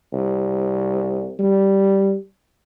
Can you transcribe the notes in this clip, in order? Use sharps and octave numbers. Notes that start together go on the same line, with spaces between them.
C2
G3